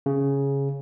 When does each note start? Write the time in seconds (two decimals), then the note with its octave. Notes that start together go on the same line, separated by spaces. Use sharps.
0.06 C#3